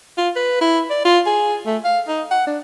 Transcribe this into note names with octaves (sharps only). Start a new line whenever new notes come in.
F4
B4
E4
D5
F4
G#4
A3
F5
D#4
F#5
D4